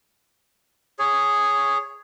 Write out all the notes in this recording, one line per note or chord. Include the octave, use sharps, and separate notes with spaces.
G#4 C#5